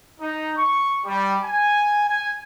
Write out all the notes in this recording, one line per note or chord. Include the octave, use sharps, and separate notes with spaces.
D#4
C#6
G3
G#5
G#5